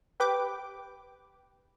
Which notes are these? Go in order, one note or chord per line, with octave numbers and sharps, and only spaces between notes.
G4 B4 G5 D6